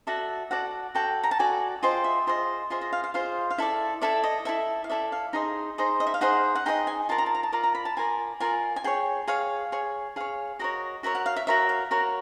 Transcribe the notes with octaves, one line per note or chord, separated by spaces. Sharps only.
F#4 A4 D5 E5
F#4 A4 D5 F#5
F#4 A4 D5 G5
A#5
A5
F#4 A4 D5 G#5
F4 G#4 C5 D#5 G5
E5
F4 G#4 C5 D#5
F4 G#4 C5 D#5 E5
D#5
F5
F5
F4 G#4 C5 D#5 F5
F5
E4 A4 D5 E5
E4 A4 D5 E5
D#5
E4 A4 D5 E5
F5
E4 A4 D5 E5
F5
D#4 G#4 C5 D#5
D#4 G#4 C5 D#5
D#5
E5
F5
D#4 G#4 C5 D#5 F#5
F#5
D#4 G#4 C5 D#5 G5
G#5
F4 A#4 D5 A5
A#5
A5
A#5
A5
F4 A#4 D5 A#5
A#5
B5
A5
F4 A#4 D5 G#5
F4 A#4 D5 G#5
G#5
G#4 C#5 G5
G#4 C#5 F5
G#4 C#5
G#4 C#5 F5
F#4 A#4 C#5 D#5
F#4 A#4 C#5 E5
F#5
F5
E5
F#4 A#4 C#5 E5
F5
F#4 A#4 C#5